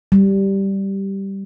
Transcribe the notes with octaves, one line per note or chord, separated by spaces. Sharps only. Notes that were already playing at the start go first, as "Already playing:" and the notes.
G3